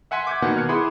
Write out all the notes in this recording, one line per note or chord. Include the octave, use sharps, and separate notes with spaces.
E5 F#5 G#5 C6 B6
D6 G6 G#6
B2 D#3 A#3 B3 F#5 G6
F6 F#6 G#6 C#7
E4 G#4 B5 C6 D6 D#6